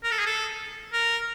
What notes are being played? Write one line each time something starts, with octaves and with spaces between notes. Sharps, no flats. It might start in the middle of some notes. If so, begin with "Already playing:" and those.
A#4
A4
G#4
A4
A#4